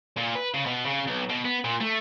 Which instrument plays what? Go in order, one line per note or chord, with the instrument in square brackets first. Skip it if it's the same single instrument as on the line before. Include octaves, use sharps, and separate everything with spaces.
[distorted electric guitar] A#2
B4
C#3
B2
C#3
B1
B2
B3
A#2
A3